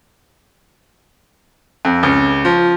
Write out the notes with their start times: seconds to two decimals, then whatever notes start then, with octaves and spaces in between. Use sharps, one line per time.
1.85 F2
2.03 C#2
2.45 F3